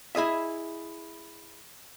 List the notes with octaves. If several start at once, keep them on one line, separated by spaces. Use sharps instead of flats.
E4 G#4 D#5 E5